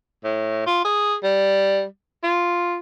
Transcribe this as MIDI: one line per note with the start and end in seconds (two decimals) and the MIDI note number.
0.24 0.62 45
0.67 0.84 65
0.85 1.15 68
1.23 1.85 55
2.24 2.78 65